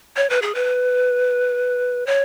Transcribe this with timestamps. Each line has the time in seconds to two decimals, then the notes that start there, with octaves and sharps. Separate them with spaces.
0.16 C#5
0.30 B4
0.42 G#4
0.55 B4
2.06 C#5